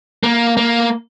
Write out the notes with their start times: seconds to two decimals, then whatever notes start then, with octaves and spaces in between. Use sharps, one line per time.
0.23 A#3
0.57 A#3